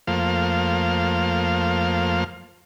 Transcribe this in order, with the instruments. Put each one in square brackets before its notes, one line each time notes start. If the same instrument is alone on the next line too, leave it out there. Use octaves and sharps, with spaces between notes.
[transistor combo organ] F2 F3 A3 A#3 C5 F5